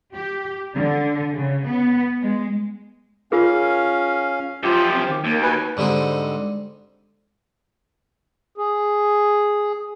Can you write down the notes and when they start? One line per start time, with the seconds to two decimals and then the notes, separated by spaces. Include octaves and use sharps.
0.13 G4
0.74 D3
1.34 C#3
1.65 B3
2.20 G#3
3.32 C#4 F4 G#4 A#4 F5
4.63 F#2 F3 F4 G4
4.93 C4
5.07 D#3
5.25 D#2 A#3
5.43 F#4 B4 G#5
5.77 G#2 D3 G3 C4 D#4
8.58 G#4